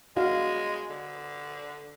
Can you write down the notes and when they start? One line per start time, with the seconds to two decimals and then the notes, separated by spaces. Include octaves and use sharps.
0.16 G#3 D4 F#4 F5
0.90 D3